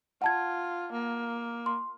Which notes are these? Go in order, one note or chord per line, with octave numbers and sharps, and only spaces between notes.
F4 F#5 A5 G#6
A#3
C6